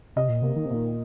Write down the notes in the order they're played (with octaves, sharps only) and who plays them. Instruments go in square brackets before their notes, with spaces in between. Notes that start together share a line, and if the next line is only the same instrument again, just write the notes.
[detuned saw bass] C3 [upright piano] D#5
[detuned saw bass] A#2
[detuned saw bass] C3 [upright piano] A#3
[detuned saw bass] D#3
C3
[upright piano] A#2 [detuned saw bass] D#3